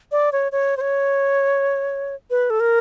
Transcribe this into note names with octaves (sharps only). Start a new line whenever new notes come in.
D5
C#5
C#5
C5
C#5
B4
A4
A#4